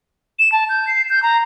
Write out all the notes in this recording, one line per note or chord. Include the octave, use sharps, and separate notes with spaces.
E7
A5
G6
C7
G6
A#5